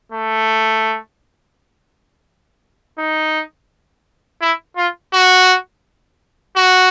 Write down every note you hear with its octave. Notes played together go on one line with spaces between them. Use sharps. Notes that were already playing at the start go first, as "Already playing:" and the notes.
A3
D#4
E4
F4
F#4
F#4